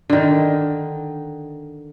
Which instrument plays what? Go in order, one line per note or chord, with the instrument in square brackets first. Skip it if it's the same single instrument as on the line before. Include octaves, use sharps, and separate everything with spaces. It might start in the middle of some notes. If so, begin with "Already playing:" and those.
[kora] D3 D#3